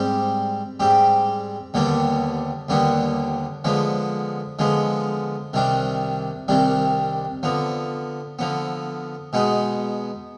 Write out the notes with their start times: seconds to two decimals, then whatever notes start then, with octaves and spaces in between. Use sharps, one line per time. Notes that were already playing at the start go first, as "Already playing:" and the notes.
Already playing: G#2 G3 C4 G4
0.80 G#2 G3 C4 G4
1.74 D#2 D3 G3 B3 D4
2.69 D#2 D3 G3 B3 D4
3.64 D3 F3 G#3 B3
4.59 D3 F3 G#3 B3
5.53 C2 C3 D#3 G3 D4
6.48 C2 C3 D#3 G3 D4
7.43 D3 F3 B3
8.39 D3 F3 B3
9.33 B2 G#3 B3 D#4